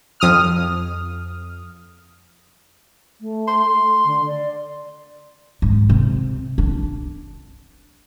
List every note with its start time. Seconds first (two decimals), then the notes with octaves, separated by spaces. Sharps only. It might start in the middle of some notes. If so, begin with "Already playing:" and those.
0.20 F2 D#6 F6
3.21 A3
3.48 C6
4.05 D3
4.26 D5
5.62 G#2
5.90 C3
6.58 D4